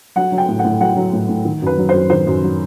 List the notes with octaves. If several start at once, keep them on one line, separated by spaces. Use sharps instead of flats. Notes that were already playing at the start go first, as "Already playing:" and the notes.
F#3 F#5
F#3
G5
A2
F#5
A2
F#3 F#5
F#3
A2
A2
D#3
F#2 B4
F#3
F#2 C5
D#3 C5
F#2
F#3